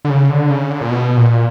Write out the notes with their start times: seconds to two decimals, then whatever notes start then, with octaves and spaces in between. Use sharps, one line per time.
0.05 D3
0.10 C#3
0.30 D3
0.50 C#3
0.71 D3
0.81 A#2
0.91 B2
1.17 A#2